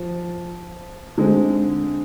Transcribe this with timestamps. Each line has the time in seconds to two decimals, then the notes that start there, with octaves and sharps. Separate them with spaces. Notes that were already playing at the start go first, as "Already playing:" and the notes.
Already playing: F3
1.18 D3 G#3 C4